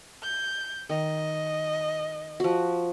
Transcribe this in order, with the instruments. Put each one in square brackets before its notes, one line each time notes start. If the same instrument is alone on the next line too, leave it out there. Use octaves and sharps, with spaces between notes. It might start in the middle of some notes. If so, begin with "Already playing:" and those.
[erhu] G6
[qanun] D#3 [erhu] D#5
[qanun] F3 F#4